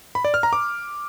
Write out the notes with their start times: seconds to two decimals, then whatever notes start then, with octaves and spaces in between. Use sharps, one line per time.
0.15 B5
0.25 D5
0.34 F6
0.43 A#5
0.53 D6